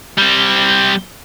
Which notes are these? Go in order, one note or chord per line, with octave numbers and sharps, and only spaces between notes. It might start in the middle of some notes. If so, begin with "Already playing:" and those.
G3 C4